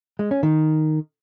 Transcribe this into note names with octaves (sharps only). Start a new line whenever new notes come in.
G#3
C#4
D#3